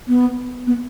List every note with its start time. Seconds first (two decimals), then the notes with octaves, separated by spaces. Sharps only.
0.08 B3
0.67 B3